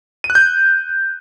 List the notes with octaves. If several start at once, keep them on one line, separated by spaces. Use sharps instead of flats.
D#7
F#6
G6